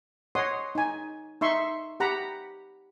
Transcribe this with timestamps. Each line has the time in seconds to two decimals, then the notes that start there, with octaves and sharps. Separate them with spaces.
0.35 C#5 D#5 F#5 C6 D#6
0.75 D#4 G#5
1.41 D#4 E5 C6 C#6
2.00 G4 F#5 A#5 B5